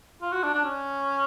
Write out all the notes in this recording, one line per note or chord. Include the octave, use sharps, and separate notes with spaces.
F4
F#4
D4
D4
C#4